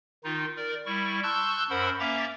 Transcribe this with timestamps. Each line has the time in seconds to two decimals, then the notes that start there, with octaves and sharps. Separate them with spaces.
0.24 D#3 D#4 F4
0.57 A#4 D5
0.86 G3 E4 C#6
1.23 A5 C6 C#6 E6 F#6 G6
1.70 F#2 A#4 C5 F#5 B5 E6
2.00 A#3 C#4 E5 A#5 D6 A6